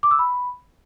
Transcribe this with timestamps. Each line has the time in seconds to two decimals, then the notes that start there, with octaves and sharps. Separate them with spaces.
0.03 D6
0.11 E6
0.19 B5